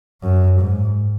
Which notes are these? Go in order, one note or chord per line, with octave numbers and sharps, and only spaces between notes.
F#2
G#2